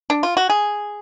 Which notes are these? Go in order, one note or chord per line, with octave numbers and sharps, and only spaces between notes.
D4
F4
F#4
G#4